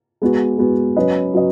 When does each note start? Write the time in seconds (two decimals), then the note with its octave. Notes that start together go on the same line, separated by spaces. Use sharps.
0.22 G#3 B3 F#4
0.58 G#3 B3 F#4
0.96 F#3 C#4 F#4 B4 D#5
1.34 F#3 C#4 F#4 B4 D#5